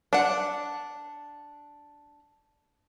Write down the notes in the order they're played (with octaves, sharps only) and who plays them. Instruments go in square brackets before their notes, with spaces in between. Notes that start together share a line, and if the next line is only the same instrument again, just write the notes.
[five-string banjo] D4 F#5